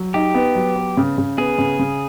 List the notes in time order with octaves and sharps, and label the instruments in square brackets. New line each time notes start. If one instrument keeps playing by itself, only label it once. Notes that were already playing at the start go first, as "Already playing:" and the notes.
Already playing: [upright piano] F#3
[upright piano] D#4 [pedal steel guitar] G4
[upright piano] B3
F#3
B3
C#3
C#3
[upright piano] B3 [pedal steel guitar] G#4
[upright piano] C#3
C#3